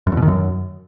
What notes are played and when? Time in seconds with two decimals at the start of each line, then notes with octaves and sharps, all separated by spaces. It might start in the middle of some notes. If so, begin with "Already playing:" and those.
0.07 F#2
0.12 E2
0.17 B2
0.22 D#3
0.28 F#2